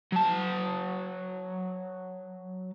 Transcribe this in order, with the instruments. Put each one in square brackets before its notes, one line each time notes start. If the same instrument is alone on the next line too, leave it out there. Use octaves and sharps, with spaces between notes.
[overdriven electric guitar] F#3 A5